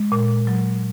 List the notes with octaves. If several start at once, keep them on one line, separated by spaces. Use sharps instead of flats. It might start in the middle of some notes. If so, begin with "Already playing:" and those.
Already playing: G#3
A#2
F#3